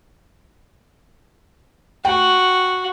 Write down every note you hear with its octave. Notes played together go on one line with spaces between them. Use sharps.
F#4 G5